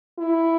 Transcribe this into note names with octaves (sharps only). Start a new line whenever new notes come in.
E4